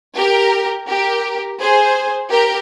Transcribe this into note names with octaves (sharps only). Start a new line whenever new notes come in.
G4 A#4
G4 A#4
G#4 C5
G4 A#4